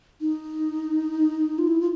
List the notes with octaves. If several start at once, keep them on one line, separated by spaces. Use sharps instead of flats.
D#4
F4
E4
F4